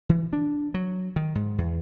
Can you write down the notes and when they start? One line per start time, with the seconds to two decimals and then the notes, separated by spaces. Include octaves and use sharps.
0.09 E3
0.33 D4
0.74 F#3
1.16 D#3
1.35 G#2
1.58 E2